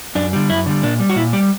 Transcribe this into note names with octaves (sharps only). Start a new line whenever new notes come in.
F#2 D4
D3 G3
F#2 E4
D3 G3
A#2 D4
G3
F#4
A#2 E4
G3 G4